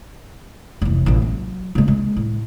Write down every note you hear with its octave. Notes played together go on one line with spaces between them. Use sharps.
F1 E3
A1 A#2
F#3
C#3 G#3
G#3
A2